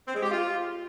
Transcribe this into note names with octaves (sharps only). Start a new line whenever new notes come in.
C4
G#3
G4
F4